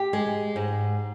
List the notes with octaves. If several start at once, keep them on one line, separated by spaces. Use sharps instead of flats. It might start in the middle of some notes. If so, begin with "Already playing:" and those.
Already playing: G4
G#3
G#2